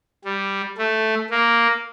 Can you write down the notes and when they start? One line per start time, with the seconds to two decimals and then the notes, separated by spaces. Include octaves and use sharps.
0.25 G3
0.78 A3
1.30 A#3